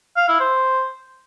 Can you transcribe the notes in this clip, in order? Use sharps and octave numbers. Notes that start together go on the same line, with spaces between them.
F5
E4
C5